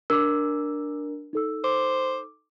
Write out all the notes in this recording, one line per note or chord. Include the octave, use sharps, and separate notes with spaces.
D4 A#4 D6 E6
D#4 A4 E6
C5 D6